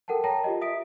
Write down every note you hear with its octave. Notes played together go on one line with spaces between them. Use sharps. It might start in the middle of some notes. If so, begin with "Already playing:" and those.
A4 A#4 F#5 G5 A5
C#5 G5 A5 A#5 A#6
F4 G4 D#5
E5 D#6 B6 D7